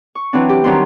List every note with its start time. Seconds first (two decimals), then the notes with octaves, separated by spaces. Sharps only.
0.15 C#6
0.33 E3 F#3 C4 D4
0.49 G4
0.64 D#3 F#3 G3 C4 D4 C6